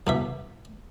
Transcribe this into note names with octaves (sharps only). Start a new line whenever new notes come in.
C2 B2 E5